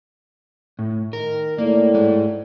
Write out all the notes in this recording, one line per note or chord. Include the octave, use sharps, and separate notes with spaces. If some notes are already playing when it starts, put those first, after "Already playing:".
A2
D#3 A#4
A2 A#3 D5
G#2 G#3